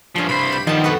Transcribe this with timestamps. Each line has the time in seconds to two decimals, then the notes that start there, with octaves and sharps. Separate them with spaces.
0.16 G2 F3 C#4 F5
0.29 C2 C5 B5
0.52 G4
0.67 D#3 F3 G3 B3 A5
0.84 F2 B3 F#4 A4 B4